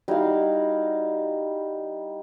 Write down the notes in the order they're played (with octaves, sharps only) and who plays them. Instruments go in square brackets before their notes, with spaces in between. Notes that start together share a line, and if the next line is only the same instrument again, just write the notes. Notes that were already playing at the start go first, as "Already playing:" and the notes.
[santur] G3 F5 [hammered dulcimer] D#4 E4 F#4